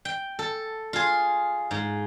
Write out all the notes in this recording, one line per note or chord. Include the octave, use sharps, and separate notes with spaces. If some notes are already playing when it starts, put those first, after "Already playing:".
G5
A4
F4 G#4
G#2